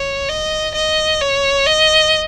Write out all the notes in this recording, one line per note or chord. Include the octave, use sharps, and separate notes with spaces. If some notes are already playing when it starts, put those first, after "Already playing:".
Already playing: C#5
D#5
D#5
C#5
D#5